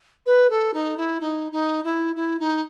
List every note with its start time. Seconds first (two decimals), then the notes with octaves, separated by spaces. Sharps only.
0.26 B4
0.50 A4
0.73 D#4
0.97 E4
1.20 D#4
1.52 D#4
1.84 E4
2.15 E4
2.39 D#4